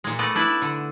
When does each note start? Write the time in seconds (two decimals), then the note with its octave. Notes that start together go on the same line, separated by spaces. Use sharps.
0.04 A#2 G#3
0.19 A3 B3 D5 D#5
0.35 D4 E4 B4
0.62 D3